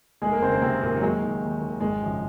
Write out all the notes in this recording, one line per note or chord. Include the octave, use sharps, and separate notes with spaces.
F1 G#3 G#4
A#3 A#4
D#2 C#3 C4 C5
A#3 A#4
F1 C3 C4
D#2 A#2 C#3 A#3
F#3
D#2 G#3
D#3
D#2
D#3
G#1 G#3
F#2 C#3 F3